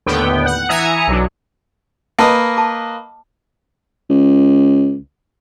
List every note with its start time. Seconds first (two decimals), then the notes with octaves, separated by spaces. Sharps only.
0.06 D#2 A2 D3 B3 G5
0.46 F#5
0.69 E3 E5 G#5 A#5 D#6 C#7
1.08 B1 F#3 D4
2.19 A#3 B4 D#5 A5
2.57 A5 D6
4.10 C#2